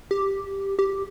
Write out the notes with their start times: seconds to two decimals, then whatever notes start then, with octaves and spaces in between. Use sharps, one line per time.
0.11 G4
0.79 G4